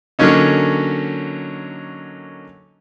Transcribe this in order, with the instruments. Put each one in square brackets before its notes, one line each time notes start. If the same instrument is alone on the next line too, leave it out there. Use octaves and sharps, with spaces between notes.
[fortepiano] D3 F#3 A#3 C#4 D#4